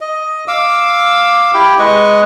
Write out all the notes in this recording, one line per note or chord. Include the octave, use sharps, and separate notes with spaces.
D#5
F5 D6 E6
E4 G4 G5
G#3 B4 D#5 C#6